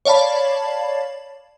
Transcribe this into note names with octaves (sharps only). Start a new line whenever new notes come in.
C#5 D5 F5 A5 B5